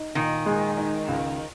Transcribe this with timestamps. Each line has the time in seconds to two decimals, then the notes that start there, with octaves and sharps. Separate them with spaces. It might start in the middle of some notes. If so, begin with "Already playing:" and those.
Already playing: D#4
0.15 A#2 D#3
0.46 G#3
0.77 D#4
1.08 C#2